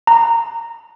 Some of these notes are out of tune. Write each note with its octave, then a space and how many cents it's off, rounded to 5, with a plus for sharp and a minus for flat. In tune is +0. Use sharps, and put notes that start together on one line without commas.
A#5 -15